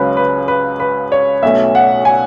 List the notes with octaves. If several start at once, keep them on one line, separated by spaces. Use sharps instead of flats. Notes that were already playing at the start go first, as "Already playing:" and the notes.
Already playing: C#2 C#3 F#3 C#4 B4
B4
B4
B4
C#5
B1 B2 A3 C#4 E5
F#5
G#5